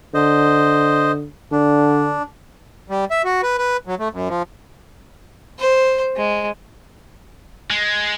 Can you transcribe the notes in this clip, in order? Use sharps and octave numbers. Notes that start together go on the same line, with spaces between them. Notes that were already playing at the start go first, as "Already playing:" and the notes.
D3 C5 D#5
D3 D4
G3
E5
F#4
B4
B4
F#3
A3
F#2
F3
C5
G#3
G#3